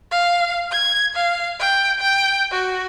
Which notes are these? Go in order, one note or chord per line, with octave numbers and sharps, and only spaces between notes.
F5
G#6
F5
G5
G5
F#4